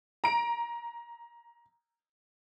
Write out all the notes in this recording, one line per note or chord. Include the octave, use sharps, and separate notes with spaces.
A#5 D7